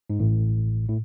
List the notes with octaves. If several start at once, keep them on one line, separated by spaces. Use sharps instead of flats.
G#2
A1 A2
A2